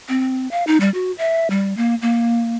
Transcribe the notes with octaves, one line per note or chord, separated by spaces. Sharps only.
C4
F5
D#4
G3
F#4
E5
G3
A#3
A#3